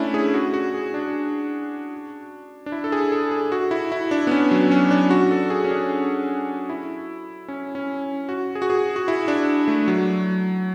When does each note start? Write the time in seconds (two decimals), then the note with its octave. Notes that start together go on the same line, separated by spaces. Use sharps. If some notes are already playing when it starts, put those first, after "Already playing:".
Already playing: A3 C#4 D4 E4
0.14 G#4
0.34 F#4
0.54 F#4
0.74 G#4
0.94 D4
2.66 D4
2.72 E4
2.84 A4
2.92 G#4
3.12 A4
3.32 G#4
3.52 F#4
3.71 E4
3.92 E4
4.11 D4
4.27 B3
4.31 C#4
4.51 F#3
4.71 C#4
4.91 D4
5.11 F#4
5.31 A4
5.50 G#4
5.64 C#4
5.71 D4
6.70 E4
7.48 C#4
7.75 C#4
8.29 F#4
8.55 G#4
8.62 F#4
8.70 G#4
8.96 F#4
9.08 E4
9.28 D4
9.68 A3
9.88 F#3